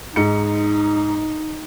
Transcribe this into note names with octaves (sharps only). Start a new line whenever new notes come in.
G#2 D#4 C#7